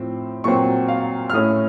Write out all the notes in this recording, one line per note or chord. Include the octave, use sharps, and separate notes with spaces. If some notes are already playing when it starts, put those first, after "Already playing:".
Already playing: A2 F3 C4
A#2 F#3 C4 C#6
F5
F6
A2 A3 C#4 D#6